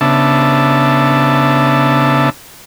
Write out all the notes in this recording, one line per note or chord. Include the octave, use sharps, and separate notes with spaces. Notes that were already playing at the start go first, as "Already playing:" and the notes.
C#3 B3 D4 E5 A5